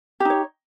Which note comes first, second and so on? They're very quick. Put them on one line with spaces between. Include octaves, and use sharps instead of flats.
G4 D#4 C#5